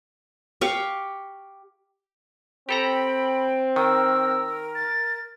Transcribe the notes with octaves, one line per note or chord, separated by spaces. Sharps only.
G4 F5 C#6
C4 G4 A4 G5 A#5 B5
D#3 A#4 E6
A6